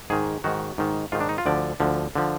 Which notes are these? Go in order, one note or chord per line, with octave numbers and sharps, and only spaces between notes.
G#2 D#3 G#4
G#2 D#3 F#4
G#2 D#3
G#2 D#3 F4
D4
D#4
F4
D2 D3 F3 D5
D2 D3 F3
D3 F3